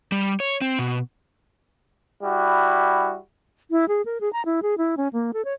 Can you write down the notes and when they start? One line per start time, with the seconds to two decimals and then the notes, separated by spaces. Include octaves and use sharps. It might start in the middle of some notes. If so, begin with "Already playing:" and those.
0.12 G3
0.40 C#5
0.61 C4
0.79 B2
2.23 G3 E4 F#4
3.71 E4
3.88 G#4
4.05 A#4
4.21 G#4
4.33 A#5
4.45 E4
4.62 G#4
4.78 E4
4.97 C#4
5.13 A#3
5.33 A4
5.45 C#5